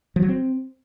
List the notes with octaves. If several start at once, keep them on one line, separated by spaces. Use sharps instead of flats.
F3
F#3
C4